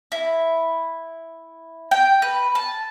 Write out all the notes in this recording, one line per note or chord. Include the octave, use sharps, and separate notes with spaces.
E4
G5
B4
A5